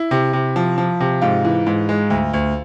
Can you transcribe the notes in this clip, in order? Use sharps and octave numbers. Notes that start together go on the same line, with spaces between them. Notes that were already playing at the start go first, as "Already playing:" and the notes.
Already playing: E4
C3
C3
F3
F3
C3
G#2 F4
E3
G#2
G#3
D2
D2